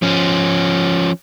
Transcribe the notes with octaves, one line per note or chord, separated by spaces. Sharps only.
F3 C#4